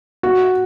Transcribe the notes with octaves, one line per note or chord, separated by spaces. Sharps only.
F#4